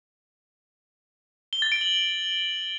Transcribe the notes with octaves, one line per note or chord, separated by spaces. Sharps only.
G7
A6
D7
F#7